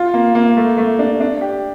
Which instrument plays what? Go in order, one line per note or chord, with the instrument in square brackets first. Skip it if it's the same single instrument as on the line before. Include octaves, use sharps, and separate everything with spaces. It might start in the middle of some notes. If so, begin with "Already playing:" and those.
Already playing: [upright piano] F4
A#3
A#3
A3
A3
D4
D4
G4